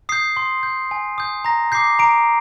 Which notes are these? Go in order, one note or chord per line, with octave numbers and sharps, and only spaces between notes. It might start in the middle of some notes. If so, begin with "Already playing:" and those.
D#6 G6 C7
C6
G6
G#5
D#6 G6
A#5 A#6
D6 G6 C7
A#5 D7